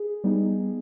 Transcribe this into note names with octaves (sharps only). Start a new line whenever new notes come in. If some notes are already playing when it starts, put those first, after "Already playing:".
Already playing: G#4
G3 B3 D#4